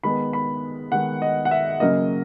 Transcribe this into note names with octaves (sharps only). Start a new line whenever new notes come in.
D#3 G#3 B3 B5
B5
D#3 G#3 B3 F#5
D#5
F#5
E5
C#3 F#3 A#3 D#5